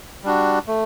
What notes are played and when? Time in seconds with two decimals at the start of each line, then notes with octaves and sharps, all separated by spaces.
0.23 G3 D4 F#4
0.67 A3